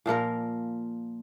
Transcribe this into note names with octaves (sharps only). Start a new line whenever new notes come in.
A#2 F3 A#3 A#4